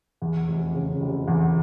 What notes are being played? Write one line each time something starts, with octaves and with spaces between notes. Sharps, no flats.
E2
F1
C#3
F1
E2